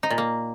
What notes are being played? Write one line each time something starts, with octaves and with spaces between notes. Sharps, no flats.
D#4
A#2
A#3